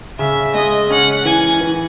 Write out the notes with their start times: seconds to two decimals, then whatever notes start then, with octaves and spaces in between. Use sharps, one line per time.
0.19 C#3 E5
0.54 G#3 D#5
0.90 C#4 F#5
1.25 E3 G#5
1.61 E3